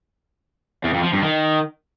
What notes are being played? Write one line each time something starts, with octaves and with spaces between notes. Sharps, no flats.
E2
F2
F3
G2
D#3